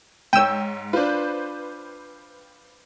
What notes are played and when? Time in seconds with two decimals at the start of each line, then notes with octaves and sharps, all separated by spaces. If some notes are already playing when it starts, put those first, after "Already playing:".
0.33 G#2 C#5 G5 E6 D#7
0.93 D4 F4 B4 C5